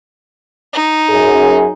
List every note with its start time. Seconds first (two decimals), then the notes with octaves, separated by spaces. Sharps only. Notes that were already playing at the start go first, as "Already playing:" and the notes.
0.74 D#4
1.09 F#2 G#4